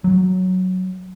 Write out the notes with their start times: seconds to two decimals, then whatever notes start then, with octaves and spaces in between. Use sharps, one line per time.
0.04 F#3